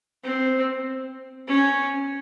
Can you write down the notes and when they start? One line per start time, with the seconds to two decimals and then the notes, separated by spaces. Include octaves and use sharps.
0.23 C4
1.47 C#4